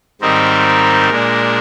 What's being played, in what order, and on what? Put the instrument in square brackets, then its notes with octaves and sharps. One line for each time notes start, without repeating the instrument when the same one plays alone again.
[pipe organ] G#2 D#3 G3 C4 D#4 A#4
A#2 G#3 D4